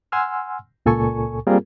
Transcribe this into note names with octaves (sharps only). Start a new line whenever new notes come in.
F#5 G#5 C6 E6 F6
C#2 A#2 A4 G#5 C#6
G3 A#3 C4 F4 G#4 A#4